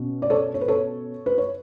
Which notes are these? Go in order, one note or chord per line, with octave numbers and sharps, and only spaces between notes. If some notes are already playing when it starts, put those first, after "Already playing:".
Already playing: B2 C#4
D5
A4 C#5
C#5
B4
A4 C#5
B4
C#5